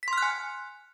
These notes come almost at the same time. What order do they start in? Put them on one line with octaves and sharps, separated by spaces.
B6 C6 F6 F#6 G#5